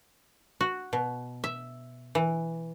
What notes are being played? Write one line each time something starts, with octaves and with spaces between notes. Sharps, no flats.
F#4
B2
E5
E3